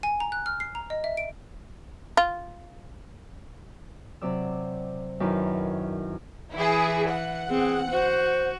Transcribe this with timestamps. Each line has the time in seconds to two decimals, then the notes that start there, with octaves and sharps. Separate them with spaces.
0.03 G#5
0.20 A#5
0.32 F#6
0.46 F6
0.60 C7
0.75 A#5
0.90 D#5
1.04 E5
1.17 D7
2.17 F4
4.22 C3 F#3 D5 E6
5.20 F#2 D#3 E4 B4
6.55 E3 E4 G#4
7.10 F#5
7.49 C4 G#4
7.91 F#4 C5